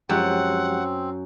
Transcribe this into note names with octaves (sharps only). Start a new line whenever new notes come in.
F#2 F3 G#3 C4 G4 F#5